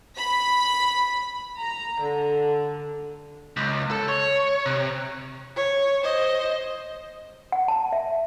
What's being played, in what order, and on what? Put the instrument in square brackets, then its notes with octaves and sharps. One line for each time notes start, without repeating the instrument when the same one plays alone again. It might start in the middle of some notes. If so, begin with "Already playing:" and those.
[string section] B5
A#5
D3
[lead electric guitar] C#2
A4
C#5
C3
[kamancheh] C#5
C5 D#5
[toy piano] F#5
A5
E5